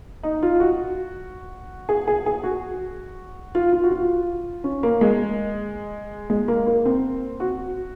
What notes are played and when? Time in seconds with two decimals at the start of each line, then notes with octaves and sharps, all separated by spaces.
0.23 D#4
0.43 F4
0.60 F#4
1.89 G#4
2.08 G#4
2.26 G#4
2.43 F#4
3.55 F4
3.73 F4
3.83 F#4
3.91 F4
4.64 C#4
4.83 A#3
5.01 G#3
6.30 G#3
6.48 A#3
6.67 A#3
6.85 C4
7.40 F#4